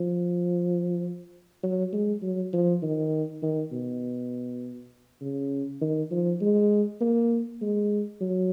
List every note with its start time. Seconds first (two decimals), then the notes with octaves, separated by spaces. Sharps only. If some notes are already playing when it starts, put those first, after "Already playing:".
Already playing: F3
1.63 F#3
1.93 G#3
2.22 F#3
2.53 F3
2.82 D#3
3.43 D#3
3.72 B2
5.21 C#3
5.81 D#3
6.11 F3
6.41 G#3
7.01 A#3
7.61 G#3
8.20 F#3